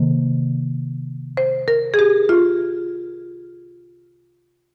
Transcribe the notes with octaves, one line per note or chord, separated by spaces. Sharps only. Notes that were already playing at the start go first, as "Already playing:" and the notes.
Already playing: C3 D#3 A#3
C5
A#4
G#4
G4
F4